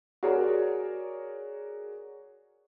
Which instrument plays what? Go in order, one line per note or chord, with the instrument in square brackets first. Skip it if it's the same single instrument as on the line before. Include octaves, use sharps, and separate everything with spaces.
[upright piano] F#4 G#4 A#4 C#5 D5